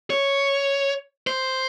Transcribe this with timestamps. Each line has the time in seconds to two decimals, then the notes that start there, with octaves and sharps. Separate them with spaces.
0.10 C#5
1.27 C5